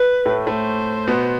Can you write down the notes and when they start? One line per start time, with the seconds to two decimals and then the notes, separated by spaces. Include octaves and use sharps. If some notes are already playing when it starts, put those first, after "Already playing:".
Already playing: B4
0.25 A2 A3
0.47 A2 A3 C5
1.07 B2 B3